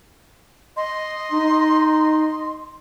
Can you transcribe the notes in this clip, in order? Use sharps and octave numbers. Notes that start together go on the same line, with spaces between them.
D#5 C6
D#4